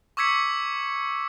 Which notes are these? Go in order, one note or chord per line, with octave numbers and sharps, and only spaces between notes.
C#6 D6 E6 G#6 B6 C#7